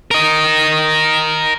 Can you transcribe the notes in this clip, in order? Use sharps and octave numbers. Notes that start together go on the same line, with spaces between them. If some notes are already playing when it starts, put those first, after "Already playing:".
A#4 D#5